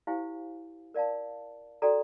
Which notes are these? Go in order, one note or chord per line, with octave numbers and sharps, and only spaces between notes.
E4 G4 C5 F5 G#5
A#4 D5 F5 A5
F#4 A4 D5 G5 A#5